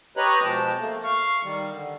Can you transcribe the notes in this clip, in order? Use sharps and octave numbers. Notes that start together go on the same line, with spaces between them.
G4 B4 C#5 D#5 A#5 F#6
B2 F3 G#3 G5 A5
A3 A#3
F5 C#6
D#3 G3
D3